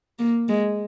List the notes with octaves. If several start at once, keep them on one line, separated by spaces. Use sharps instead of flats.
A#3
G#3